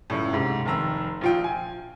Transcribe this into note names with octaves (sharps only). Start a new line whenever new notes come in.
C#2 F#2 A2
G#2 C3
F1 D#3 A#5 E6
A#1 F4 G5
G#5